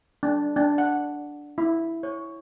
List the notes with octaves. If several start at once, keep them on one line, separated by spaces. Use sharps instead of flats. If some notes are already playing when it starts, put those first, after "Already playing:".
D4
D4
F#5
E4
C#5